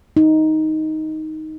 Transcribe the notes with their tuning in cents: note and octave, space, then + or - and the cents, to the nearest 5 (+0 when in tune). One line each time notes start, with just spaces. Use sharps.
D#4 +5